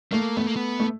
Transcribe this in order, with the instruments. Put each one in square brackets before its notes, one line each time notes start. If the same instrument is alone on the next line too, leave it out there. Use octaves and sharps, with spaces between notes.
[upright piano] A3 [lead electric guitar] A#3
[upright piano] A3 [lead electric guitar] B3
[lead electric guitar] A#3
B3
[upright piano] A3